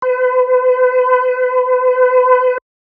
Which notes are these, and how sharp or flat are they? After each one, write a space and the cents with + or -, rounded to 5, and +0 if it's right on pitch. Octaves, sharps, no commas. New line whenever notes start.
B4 +40